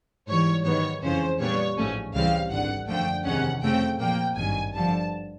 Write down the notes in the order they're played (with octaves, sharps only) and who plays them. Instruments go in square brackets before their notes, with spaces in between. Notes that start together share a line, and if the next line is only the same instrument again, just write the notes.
[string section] G#2 E3 G3 C#5
G#2 D#3 F#3 B3 C#5
F2 C#3 E3 G#3 C#4 C5
A#2 G3 B3 D4 C#5
A1 G#2 F3 A3 C#4
C#2 C#3 E3 G3 C4 F5
G#1 G2 D3 F#5
F#2 D3 F3 A3 G5
E2 C3 D#3 G#3 C#4 F#5
F2 C#3 F3 A3 C4 G5
A#2 F3 A#3 G5
G#1 G2 D#3 F#3 G#5
G2 D3 F3 A5